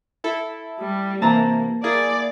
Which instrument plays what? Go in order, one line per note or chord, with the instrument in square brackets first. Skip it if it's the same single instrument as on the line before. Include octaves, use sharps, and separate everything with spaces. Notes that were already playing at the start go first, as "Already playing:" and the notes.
[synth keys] E4 A4
[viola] G3
[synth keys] C3 E3 [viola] A#3 [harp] A5 A#5
[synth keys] A#3 E4 G#4 [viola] D5